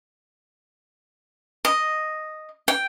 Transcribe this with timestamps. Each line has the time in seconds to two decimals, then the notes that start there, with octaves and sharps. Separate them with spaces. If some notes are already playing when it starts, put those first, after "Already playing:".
1.65 D#5
2.68 G5